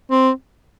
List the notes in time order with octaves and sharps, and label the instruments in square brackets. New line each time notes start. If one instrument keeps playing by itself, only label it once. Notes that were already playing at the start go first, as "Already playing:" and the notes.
[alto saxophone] C4